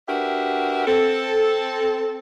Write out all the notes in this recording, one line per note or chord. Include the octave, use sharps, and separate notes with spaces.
D4 F#4 G4 A#4 B4 E5
C4 A4